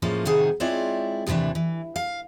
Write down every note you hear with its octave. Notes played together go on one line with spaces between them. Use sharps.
A2 F3 G#3 A#3 C#4
A2 C3 D#3 D#4 G#4 F#5
G#3 C4 E4 F4 C#5 D5
D#2 A2 C3 E3 D4
E3
F5